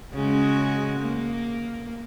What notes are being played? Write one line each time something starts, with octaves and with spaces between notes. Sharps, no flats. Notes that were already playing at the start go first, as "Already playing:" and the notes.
C#3 G#3 F#4
A#3